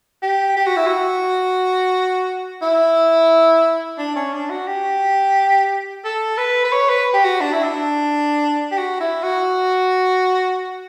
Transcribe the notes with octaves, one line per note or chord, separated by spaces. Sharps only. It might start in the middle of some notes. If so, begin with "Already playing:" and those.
G4
G4
F#4
E4
F#4
E4
D4
C#4
D4
F#4
G4
A4
B4
B4
C#5
B4
G4
F#4
D4
E4
D4
G4
F#4
E4
F#4